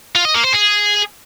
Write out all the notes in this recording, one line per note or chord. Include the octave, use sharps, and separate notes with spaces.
F4
D#5
A#3
C5
G#4